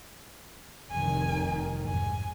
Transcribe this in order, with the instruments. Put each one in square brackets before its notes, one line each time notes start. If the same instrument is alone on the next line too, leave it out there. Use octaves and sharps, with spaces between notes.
[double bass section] F1 C2 D#3 [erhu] G#5
[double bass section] G#2 [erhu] G#5